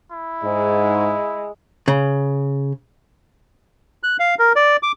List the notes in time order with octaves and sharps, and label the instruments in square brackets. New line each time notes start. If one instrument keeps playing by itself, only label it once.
[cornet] E4
[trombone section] G#2 [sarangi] G#3
[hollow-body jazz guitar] C#3
[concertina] F#6
F5
A#4
D5
D6